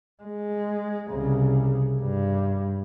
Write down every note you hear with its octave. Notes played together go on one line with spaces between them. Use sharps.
G#3
C2 C#3
G2